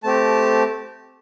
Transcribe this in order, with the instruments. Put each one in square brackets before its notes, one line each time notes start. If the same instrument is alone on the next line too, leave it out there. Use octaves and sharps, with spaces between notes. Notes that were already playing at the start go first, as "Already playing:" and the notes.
[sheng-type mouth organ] A3 C4 G4 A5